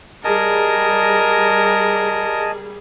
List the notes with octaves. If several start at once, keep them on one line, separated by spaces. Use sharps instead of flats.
G3 G#4 A#4 D#5 G#5 A5